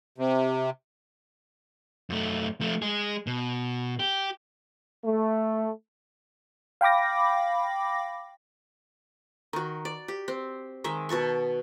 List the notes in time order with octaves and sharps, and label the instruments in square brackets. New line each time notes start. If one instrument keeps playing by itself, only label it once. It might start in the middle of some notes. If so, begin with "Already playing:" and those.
[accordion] C3
[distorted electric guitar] F#2 A3
F3 A3
G#3 G#4
B2
G4
[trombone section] A3
[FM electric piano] F5 G5 B5 D6 A#6
[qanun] D#3 F#4
D5
G4
C4
D#3 G#3 E5
B2 F#4 A5 C#6